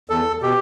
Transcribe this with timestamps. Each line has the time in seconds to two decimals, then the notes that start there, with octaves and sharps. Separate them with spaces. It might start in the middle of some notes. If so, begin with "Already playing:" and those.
0.10 E2 A4
0.42 B2 G4